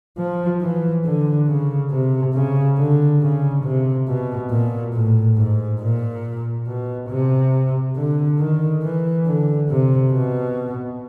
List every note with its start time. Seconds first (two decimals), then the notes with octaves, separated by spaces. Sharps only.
0.18 F3
0.61 E3
1.05 D3
1.48 C#3
1.91 C3
2.34 C#3
2.78 D3
3.22 C#3
3.64 C3
4.07 B2
4.50 A#2
4.94 A2
5.37 G#2
5.81 A#2
6.67 B2
7.10 C3
7.97 D3
8.39 D#3
8.83 E3
9.26 D3
9.69 C3
10.12 B2